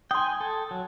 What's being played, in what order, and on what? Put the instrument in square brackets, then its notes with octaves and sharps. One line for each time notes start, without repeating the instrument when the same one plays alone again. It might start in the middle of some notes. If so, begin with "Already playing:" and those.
[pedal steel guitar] G5 G#5 [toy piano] C6 D#6
[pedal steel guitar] A4
F#3